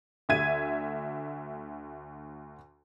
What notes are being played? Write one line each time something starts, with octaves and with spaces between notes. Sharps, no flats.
D2 E5 G#6 D#7